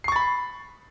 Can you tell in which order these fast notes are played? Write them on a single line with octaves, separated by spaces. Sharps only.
C7 C#6 A6 B5